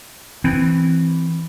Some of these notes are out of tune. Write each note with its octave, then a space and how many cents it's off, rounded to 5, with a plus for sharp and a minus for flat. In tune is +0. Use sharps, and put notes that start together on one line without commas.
E3 +0 C4 +0